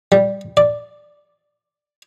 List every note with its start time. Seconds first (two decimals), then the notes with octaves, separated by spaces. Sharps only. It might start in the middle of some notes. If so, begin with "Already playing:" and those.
0.12 G3
0.57 D5